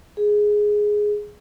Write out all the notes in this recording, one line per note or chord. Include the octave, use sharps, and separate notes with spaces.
G#4